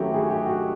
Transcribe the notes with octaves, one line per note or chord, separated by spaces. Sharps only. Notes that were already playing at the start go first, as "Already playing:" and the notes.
Already playing: D#3 F#3 A3 C#4 E4 F#4 G4
G#4
G4
F#4